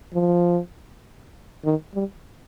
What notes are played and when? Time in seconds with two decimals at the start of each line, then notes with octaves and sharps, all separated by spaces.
0.14 F3
1.64 D#3
1.94 G3